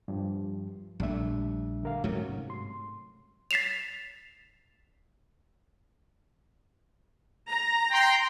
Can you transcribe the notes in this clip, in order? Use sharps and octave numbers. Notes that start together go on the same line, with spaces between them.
G2 F3
A#1 G3 A3 D4 E5
D3 A#4 F5
G#2 C3 F#3 A3 C#4
C6
A6 B6 C7 E7 F7
A#5
G5 C6